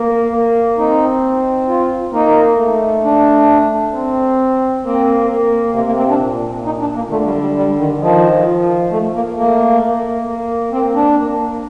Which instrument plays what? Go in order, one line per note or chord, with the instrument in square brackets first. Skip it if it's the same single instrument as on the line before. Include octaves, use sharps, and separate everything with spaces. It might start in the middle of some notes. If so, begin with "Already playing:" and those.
Already playing: [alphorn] A#3
A#3
[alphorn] C4 [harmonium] D#4
[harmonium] F4
[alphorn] A#3 [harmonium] D#4
[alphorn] A3
[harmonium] D4
[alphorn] C4
[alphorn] A#3 [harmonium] C4
[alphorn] A#3
[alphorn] C3 [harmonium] A#3
[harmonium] A#3
C4
D4
[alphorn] A#2
[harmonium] D#4
D4
A#3
[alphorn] D3 [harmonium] A3
[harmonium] G3
G3
G3
D#3
[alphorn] D#3 [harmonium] F3
[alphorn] F3
[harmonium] A3
A#3
[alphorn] A3 [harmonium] A#3
[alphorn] A#3
A#3
[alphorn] A#3 [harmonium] C4
[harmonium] D4
[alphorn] A#3